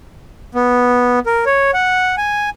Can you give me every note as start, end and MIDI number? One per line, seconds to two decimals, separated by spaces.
0.55 1.19 59
1.26 1.45 70
1.46 1.71 73
1.74 2.15 78
2.17 2.50 80